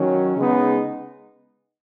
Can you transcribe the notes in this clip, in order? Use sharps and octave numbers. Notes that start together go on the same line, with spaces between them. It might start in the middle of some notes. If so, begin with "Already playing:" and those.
Already playing: D#3 F#3 C#4
C#3 G#3 B3 D#4